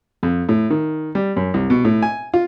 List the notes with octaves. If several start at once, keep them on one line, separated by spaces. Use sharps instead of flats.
F2
A2
D#3
G3
F#2
C2
B2
A2
G#5
F4